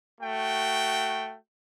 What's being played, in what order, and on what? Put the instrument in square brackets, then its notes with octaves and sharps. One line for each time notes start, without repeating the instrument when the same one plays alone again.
[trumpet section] A3 F#4 G5